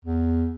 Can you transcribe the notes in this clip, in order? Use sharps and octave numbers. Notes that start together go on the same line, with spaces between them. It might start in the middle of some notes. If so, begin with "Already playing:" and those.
E2